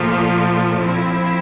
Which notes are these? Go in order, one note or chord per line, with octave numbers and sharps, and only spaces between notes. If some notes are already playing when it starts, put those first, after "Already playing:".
Already playing: A#2 F3 A3
F3 C4 E4